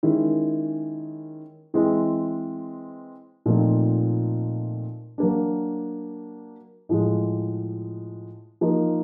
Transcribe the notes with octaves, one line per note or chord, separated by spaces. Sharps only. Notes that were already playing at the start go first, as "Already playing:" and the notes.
D#3 G#3 C#4 E4
E3 G#3 C4 E4
A#2 F3 A3 C4 D#4
F#3 A#3 D4
A2 F3 G#3
F3 A#3 D#4